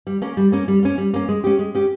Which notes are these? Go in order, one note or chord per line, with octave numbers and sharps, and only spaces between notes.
G3
A#3 C#4
G3
A#3 C#4
G3
A#3 C#4
G3
A#3 C#4
G#3
C#4 G4
G#3
C#4 G4